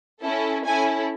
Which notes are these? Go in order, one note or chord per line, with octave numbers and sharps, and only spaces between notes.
C#4 E4 A4
C#4 E4 A4 G#5